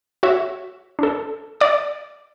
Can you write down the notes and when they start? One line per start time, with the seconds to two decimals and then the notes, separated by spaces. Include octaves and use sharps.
0.23 F#4 C#5 E5
0.99 D4 A4
1.61 D5 D6